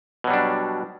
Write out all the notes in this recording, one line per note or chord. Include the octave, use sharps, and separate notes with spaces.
B2 F#3 G3 D4